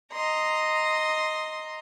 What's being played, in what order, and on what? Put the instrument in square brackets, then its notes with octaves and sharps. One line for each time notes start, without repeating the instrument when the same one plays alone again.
[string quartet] D#5 A#5 C6